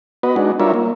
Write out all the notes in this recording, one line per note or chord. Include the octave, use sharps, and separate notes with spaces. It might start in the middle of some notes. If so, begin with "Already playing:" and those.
B3 F#4 B4 D#5
G#3 D4 D#4 F#4
G3 D4 F4 A#4 C#5 E5
A#3